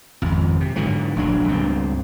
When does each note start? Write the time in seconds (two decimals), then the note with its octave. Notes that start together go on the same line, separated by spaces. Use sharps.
0.22 G#1 F2
0.61 C3
0.76 G#2 D3 E3 F#3
1.16 E1 A#1 F#3 D4
1.47 C#2 G2 B2 C4